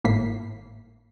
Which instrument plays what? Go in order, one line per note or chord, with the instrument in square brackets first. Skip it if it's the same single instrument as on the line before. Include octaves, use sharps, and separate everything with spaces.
[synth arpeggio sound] G#1 A2 A#3 E4 B6 C7